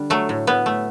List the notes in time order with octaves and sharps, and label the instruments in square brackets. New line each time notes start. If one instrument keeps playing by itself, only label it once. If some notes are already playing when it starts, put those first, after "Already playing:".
Already playing: [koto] D3 G3 D4
F#3 A3
A2
A2 B3
A3